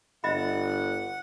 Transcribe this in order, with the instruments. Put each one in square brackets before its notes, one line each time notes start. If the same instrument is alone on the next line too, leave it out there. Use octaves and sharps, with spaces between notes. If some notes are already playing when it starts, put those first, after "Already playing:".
[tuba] G1 [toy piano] D#5 E5 B5 [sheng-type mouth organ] F#5